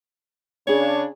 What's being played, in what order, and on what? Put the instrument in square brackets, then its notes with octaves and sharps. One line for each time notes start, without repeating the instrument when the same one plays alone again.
[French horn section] C#3 D4 [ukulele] C#4 G#4 [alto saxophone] C#5